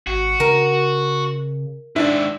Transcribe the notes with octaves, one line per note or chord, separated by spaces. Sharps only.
G#1 F#4
C#3 A#4
G#2 D#3 D4 E4